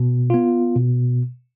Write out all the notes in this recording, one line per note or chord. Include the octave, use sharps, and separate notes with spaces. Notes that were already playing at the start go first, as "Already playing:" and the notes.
Already playing: B2
B3 F4
B2